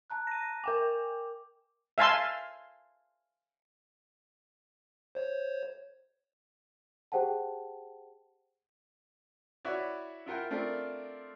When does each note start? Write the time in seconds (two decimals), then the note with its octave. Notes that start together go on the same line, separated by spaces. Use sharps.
0.10 A5 A#5 F#6
0.27 A#6 D#7
0.64 A#4 G5 G#5 D6
1.98 E5 F5 G#5 A5 C6
5.15 C5 C#5
7.12 G4 G#4 C5 F#5 G5 A5
9.65 E4 F#4 B4 C#5 D5
10.26 E4 F4 A#4 F#5 G5
10.51 A3 C4 D4 F4 A#4